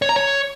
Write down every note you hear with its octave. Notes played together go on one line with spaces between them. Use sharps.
C#5
A#5
C#5